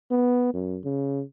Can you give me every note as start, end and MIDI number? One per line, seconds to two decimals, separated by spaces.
0.11 0.51 59
0.54 0.79 42
0.85 1.22 49